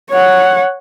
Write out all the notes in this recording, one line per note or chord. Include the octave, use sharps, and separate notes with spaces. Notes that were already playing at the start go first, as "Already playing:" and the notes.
C#5 F#5